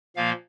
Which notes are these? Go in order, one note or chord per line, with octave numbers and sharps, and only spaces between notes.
A#2 F3 A#3 F5